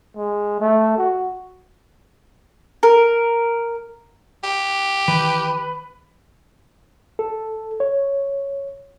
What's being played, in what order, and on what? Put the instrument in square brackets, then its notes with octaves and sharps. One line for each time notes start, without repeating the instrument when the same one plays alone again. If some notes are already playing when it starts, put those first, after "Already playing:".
[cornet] G#3
A3
F#4
[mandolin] A#4
[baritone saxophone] G4
[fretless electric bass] D#3 E3 [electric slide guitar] B4
[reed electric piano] A4
C#5